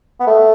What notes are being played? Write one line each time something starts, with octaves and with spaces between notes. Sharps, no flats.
B3
A3